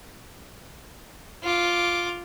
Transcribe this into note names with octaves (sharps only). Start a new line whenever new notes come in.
F4 D6